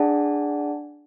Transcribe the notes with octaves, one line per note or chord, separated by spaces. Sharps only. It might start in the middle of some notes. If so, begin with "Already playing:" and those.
Already playing: D4 G#4 D5 F#5 A5